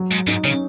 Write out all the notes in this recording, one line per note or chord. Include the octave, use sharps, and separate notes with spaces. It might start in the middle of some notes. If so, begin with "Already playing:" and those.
Already playing: F#3
G#2
G#2 D#4
C#3 C#4